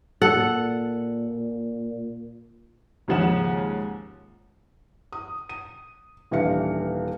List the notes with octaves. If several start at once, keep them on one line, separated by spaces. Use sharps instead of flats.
A#2 A4 F#5
D#2 G#2 C#3 F3 F#5 E7
D#6
D#7
D#1 E3 D4 F5 C#7